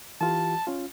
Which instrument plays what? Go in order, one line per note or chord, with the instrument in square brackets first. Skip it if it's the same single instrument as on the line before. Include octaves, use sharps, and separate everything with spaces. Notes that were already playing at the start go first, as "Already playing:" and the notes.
[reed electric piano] E3 F4 G4 [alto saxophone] A5
[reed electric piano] C#4 F4